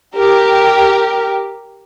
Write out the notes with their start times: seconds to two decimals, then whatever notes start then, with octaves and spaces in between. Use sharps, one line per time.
0.17 G4 A#4